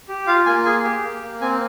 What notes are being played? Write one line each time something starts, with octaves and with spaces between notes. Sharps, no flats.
G4
F4 F5
A#3 G#5
G#4 G#5
G4
A#3
A#3
C4 G#5